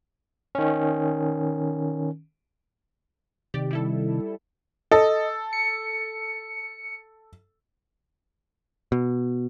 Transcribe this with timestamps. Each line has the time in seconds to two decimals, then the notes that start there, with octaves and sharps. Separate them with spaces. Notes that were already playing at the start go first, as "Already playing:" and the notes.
0.55 D#3 C#4
3.54 C3 D#3 G4 D5
3.71 G3 E4 A4
4.92 A4 D#5
5.53 C#7
8.92 B2